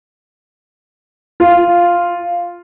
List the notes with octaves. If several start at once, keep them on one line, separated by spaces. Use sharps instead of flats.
F4